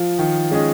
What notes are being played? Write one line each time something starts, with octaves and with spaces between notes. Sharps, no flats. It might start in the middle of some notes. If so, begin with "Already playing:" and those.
Already playing: F3 F4
D#3
G#3 C#4 G#4 D#5